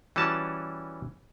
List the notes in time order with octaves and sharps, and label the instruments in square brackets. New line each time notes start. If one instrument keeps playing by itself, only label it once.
[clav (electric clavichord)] E3 G3 C#4 F#4 A5